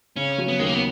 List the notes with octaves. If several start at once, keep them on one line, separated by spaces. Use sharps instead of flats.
C#3 C#4
F#3
B3
D#2 G#3
A#3
B3